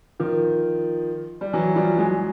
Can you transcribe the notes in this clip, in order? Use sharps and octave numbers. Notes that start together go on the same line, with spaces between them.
D#3 F3
G3
E3 F#3
F3 G3
F#3 G#3